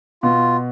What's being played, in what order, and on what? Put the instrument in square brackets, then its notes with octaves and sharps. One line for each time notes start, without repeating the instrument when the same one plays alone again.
[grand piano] B2 [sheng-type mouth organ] F4